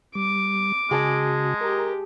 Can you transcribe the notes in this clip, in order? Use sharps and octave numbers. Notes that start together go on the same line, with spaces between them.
G3 D6
C#3 G#3 F#4 G#4 A5
G4 A#4 A#5